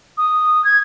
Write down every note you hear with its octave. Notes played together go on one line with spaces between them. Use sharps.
D#6
G#6